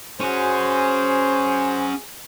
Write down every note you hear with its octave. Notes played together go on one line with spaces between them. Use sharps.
C#4 F#4 G#4 C5